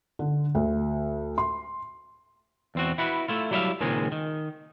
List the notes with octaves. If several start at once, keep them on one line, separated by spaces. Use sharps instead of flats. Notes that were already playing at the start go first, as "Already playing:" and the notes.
D3
D2
C6
E2 C4 F#4
E4 F#4 B4
A3 E4 F4
F#3 G3 E4 F4 E5 F5
C#2 A#2 D#3 G#3 C4 C#4
D#3